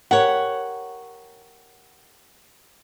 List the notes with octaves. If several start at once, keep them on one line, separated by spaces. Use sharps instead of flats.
G4 A#4 C#5 F#5